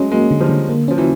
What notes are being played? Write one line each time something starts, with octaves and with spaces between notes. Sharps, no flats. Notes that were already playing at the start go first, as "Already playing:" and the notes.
Already playing: F#3 G#3 A3 C#4
F#3 G#3 A#3
D3
F3 G3
D3
A#3
F3 C#4
E3 F#3